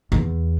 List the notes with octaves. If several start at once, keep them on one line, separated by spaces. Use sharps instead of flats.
E2